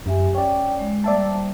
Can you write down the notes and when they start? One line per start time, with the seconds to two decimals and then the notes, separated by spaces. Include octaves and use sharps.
0.06 F#2 G4 E5 G#5
0.34 C#4 C#5 D5 G5
0.79 G#3
1.04 G3 A#3 C5 D5 E5 A5